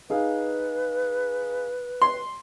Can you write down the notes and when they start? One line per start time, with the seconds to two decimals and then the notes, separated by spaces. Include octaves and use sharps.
0.10 D#4 G#4 B4 F5
2.02 C6